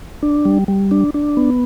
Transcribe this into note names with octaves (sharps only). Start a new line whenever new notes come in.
D4
G3
G3
D4
D4
B3